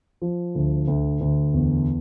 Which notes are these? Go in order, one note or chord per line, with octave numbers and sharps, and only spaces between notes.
F3
D2
D2
D2
E2